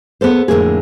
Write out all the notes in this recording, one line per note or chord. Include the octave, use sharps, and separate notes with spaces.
B3 G#4 A4 C5
F2 A2 D3 A#3 G#4